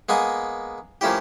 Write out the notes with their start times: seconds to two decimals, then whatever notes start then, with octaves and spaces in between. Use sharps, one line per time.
0.09 G#3 A#3 B3 G#5
1.01 F3 A3 A#3 C#4 E4 G4